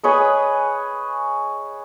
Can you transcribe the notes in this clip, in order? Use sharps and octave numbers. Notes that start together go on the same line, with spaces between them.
G#4 B4 C#5 D#5